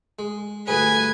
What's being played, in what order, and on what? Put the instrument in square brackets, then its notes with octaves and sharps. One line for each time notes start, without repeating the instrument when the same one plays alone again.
[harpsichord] G#3
[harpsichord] D2 G2 G#4 [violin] B4 G#5